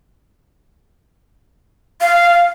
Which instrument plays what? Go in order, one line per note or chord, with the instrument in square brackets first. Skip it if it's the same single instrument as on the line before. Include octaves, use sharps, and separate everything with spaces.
[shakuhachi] F5